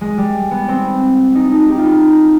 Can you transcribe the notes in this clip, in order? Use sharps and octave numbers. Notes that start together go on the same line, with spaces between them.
G#3
G3
B3
C4
D#4
D#4
G4
F4
D#4